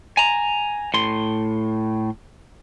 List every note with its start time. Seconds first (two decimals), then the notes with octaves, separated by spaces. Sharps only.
0.17 G#5 A#5
0.94 A2 C6